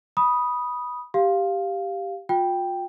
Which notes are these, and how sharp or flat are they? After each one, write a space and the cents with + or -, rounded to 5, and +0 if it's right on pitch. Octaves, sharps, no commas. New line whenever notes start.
B5 -15 D#6 +0
G4 +0 F5 +0
F4 +40 G5 +0